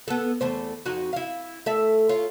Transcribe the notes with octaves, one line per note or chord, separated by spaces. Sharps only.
B3 A4
E2 A3 C5
F2 D#4 F#4
E4 F5
A3 A4 E5
F4 C#5